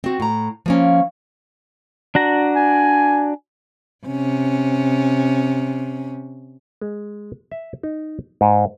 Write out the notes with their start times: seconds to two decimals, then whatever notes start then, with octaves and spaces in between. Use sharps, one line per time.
0.04 C4 F#4
0.20 A2 A#5
0.66 F3 A#3 C#4
2.15 D4 F#4 A#5
2.55 G#5
4.06 C3 C#4
6.81 G#3
7.52 E5
7.83 D#4
8.41 G#2